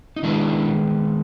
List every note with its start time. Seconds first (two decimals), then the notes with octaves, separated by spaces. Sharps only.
0.16 D#4
0.23 D#3 G#3 B3 D4 E4